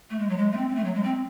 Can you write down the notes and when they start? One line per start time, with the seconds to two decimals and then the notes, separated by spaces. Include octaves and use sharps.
0.10 A3
0.19 G#3
0.29 F#3
0.37 G#3
0.52 A3
0.57 C4
0.69 C4
0.75 A3
0.84 F#3
0.94 G#3
1.03 C4